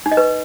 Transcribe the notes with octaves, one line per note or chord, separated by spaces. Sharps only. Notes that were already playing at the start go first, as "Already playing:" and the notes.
D#4
D#5
B4